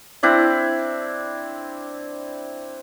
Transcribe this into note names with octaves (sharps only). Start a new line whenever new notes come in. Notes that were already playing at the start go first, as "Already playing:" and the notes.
C4 D4 E4 D5